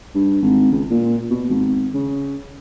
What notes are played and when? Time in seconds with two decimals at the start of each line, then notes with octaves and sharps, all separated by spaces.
0.15 G2
0.42 G#1
0.72 C#2
0.90 A#2
1.30 B2
1.50 G#1
1.94 C#3